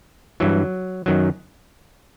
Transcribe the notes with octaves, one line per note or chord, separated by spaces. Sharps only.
G2 E3 F#3
F#2 D#3 F#3